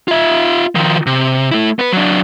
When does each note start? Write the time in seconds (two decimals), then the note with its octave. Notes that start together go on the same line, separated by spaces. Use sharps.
0.08 F4 E5
0.75 D#3 F3
1.06 C3
1.51 A3 E4
1.79 B3 B4
1.92 F#3 D4